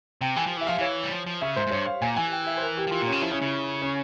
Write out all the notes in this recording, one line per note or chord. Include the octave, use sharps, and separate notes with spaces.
C3 G5
E3 G#5
F3
E3 E5
F3 F5
E3 C#5
G3
F3
F3
C#3 E5
G#2 C5
G#2
G2 C#5
F5
A#2 G#5
E3 G#5
G5
E5
C5
A#4
G4
F3
E3 F4
A#2
C#3 C#4
F3 E4
C#3 C#4
C#3 E4
C#4